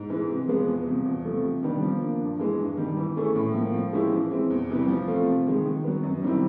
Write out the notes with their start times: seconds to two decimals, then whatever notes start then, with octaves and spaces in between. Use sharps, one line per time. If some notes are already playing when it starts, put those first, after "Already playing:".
Already playing: G#2
0.10 E3 G#3
0.29 C3
0.48 F3 G#3 B3
0.67 E2
0.87 C3 F3
1.05 E2
1.25 C3 F3 A3
1.44 C3
1.63 D#3 G3 B3 D4
1.82 F3
2.01 A#3 D4
2.21 G2
2.39 E3 G#3
2.59 G2
2.77 D#3 G3
2.97 E3
3.17 A3 C#4 E4 G#4
3.35 A2
3.54 F3 A#3
3.74 F3
3.92 G#3 C#4 E4 G4
4.12 E3
4.31 G#3 C4 E4
4.50 E2
4.69 C3 E3 G3
4.88 F3
5.08 A3 C4 F4
5.27 C3
5.47 D#3 G#3
5.65 D#3
5.84 F#3 B3
6.03 F#2
6.23 D#3 G3 C4 E4